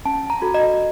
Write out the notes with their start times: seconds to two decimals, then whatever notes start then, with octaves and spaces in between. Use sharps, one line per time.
0.05 C#4 A5
0.30 A#5
0.42 F#4 A4
0.54 D#5